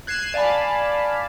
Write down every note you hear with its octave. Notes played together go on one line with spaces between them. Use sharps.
F#6 G#6 C7 D#7 E7
D5 F5 G#5 A5 B5